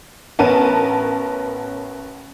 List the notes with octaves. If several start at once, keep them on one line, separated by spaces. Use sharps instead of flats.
A1 B3 C#4 A#4 A5 D#7